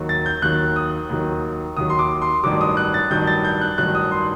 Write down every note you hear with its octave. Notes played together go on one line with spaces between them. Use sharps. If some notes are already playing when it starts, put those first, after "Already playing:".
Already playing: D#2 D#3 F#3
A6
G6
D#2 D#3 F#3 F#6
D#6
D#2 D#3 F#3
D#2 D#3 F#3 D#6
C6
D6
C6
A1 G2 D#3 F#3 D6
D#6
F#6
A6
A1 G2 D#3 F#3 G6
A6
G6
F#6
A1 G2 D#3 F#3 F#6
D#6
C6